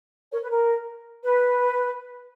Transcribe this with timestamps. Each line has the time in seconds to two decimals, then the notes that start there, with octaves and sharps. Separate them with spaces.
0.31 A#4 C#5
0.42 B4
0.50 A#4
1.23 B4